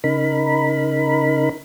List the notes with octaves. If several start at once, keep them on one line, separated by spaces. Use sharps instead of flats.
C#3 D#4 A#4 B5